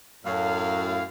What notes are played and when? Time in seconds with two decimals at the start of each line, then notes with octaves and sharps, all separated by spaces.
0.24 F#2 A2 F5